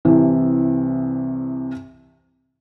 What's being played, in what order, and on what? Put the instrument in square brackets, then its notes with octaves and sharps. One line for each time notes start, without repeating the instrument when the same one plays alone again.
[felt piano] C2 C3 E3